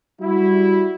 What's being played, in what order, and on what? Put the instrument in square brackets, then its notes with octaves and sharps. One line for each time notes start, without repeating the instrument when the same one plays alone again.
[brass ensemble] G3 E4 F#4